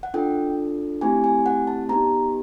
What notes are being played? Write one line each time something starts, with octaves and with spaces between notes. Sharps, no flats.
F#5
D4 F4 A4 G5
A3 C4 E4 G4 G#5
G#5
F#5
A5
B3 D#4 G4 A#5